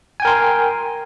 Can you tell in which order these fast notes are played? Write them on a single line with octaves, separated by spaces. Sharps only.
G#5 G5 A#4 C6